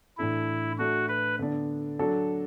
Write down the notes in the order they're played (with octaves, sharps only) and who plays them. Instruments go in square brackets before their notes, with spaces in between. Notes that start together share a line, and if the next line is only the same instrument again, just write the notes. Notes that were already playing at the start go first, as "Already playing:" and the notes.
[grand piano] A2 E3 D4 A4 [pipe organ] E4
[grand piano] A3 D4 A4 [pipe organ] F#4
[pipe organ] B4
[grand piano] D3 B3 D4
F#3 D4 F#4 A4